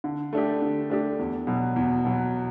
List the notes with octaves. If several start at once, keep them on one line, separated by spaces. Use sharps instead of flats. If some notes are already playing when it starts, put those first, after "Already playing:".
D3
A3 D4 G4
D3
A3 D4 G4
E2
B2 F#3
E2
B2 F#3